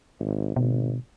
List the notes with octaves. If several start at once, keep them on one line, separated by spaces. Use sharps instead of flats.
G#1
G#1 B2